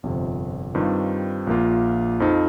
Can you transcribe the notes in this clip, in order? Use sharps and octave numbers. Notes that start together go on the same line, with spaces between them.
G1 F2 C3
G2 D#3 G3 C4 F4
A#1 A#2 A#3 F4
F2 F3 D#4